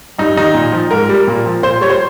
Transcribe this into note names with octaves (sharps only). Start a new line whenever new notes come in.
G2 D#4
D#3 G3 D#4
A#2
F3
G#2 A#4
G3
A#2
F3
A#2 C5
G3 C#5
C5